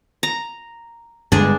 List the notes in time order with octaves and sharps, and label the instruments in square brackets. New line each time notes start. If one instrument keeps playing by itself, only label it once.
[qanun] A#5
[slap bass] G2 D3 G#3 [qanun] D4 G#4